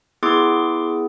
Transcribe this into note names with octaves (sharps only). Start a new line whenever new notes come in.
B3 E4 G#4 C6 D6